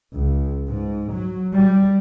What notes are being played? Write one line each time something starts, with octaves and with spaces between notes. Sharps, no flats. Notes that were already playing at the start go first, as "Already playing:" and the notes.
C#2
G#2
F#3
G3